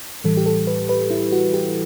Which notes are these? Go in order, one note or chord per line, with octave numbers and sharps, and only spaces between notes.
A2 E3 G3 A4
G4
A4
B4
B4
E4
F#4
G4